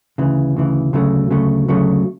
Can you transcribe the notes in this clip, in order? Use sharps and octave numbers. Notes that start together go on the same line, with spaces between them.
D2 C#3 E3
D2 C#3 E3
D2 C#3 F#3 A3
D2 C#3 F#3 A3
D2 C#3 F#3 A3